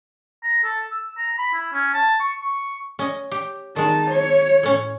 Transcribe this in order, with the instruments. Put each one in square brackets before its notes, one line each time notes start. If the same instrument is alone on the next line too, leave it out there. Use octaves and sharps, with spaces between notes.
[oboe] A#5
A4
E6
A#5
B5
E4
C#4
A5
C#6
C#6
[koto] C#4 D#5
G4
[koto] D#3 G#3 [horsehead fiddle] D#4 A5
[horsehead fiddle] C#5
[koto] A2 C#4